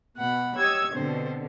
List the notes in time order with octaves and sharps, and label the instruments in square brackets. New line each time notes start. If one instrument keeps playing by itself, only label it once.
[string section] B2 [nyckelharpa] F#5 B5
[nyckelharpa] G4 D#5 [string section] C#5 E6 G#6
[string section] B2 D3 [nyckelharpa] C4 C5